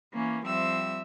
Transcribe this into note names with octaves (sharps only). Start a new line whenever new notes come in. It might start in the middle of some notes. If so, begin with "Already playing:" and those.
E3 A#3 C#4
F3 G3 C4 E5 E6